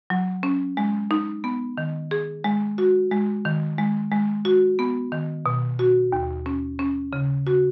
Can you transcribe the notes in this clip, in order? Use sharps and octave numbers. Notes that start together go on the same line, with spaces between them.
F#3
C#4
G#3
D#4
B3
D#3
G#4
G#3
F#4
G#3
D#3
G#3
G#3
F#4
B3
D#3
B2
F#4
D#2
C#4
C#4
C#3
F#4